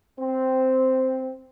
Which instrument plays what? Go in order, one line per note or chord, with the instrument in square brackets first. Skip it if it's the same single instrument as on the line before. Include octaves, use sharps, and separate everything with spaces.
[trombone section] C4